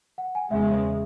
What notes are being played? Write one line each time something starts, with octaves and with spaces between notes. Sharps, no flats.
F#5
G#5
E2 C#3 G#3 E5